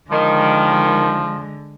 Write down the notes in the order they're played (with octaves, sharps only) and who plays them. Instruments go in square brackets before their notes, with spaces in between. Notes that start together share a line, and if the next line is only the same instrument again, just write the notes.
[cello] D3 G#3 [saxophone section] D#3 [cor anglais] F3